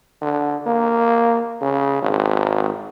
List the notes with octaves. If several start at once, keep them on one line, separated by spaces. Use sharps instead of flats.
D3
A#3
C#3
G#1